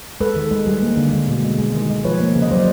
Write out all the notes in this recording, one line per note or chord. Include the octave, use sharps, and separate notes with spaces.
G#3 A4 B4
D#3
G#3
G3
A#3
D3
G#3
B2
G#3
G#3
D#3
G#3
F3 B4 C#5
A#3
C#3
D#5
F#3 C5 D5